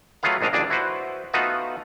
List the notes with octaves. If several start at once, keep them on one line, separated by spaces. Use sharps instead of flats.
F#3 A3 F4 G#4 B4 F5
A#1 G#2 D4 D#5 F5
A1 D2 G2 D4 G#4 D5
E4 F#4 B4 C5
A3 B3 D#4 F4 F#4 B4